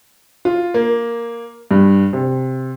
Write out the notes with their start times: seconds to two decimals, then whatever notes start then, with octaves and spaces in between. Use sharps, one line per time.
0.45 F4
0.74 A#3
1.71 G2
2.13 C3